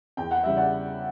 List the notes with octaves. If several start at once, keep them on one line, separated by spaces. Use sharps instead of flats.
E2 G5
F#5
C#3 E3 G3 E5
D5 F#5